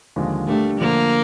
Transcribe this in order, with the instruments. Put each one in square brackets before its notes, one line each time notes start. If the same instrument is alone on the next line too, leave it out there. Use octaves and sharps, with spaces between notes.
[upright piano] D#2 D3 F3 G#3
[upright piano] D3 G3 A#3 D4 G4 [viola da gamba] A3
[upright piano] D3 F3 A3 D4 [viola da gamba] A#3